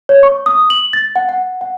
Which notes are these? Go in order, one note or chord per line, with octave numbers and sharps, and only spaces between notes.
C#5
C#6
D#6
F#7
A6
F#5
F#5
F#5